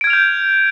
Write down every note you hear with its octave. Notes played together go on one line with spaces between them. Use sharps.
F6 G6 G#6 D7 F7